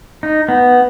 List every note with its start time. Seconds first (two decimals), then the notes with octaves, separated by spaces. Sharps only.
0.23 D#4
0.48 B3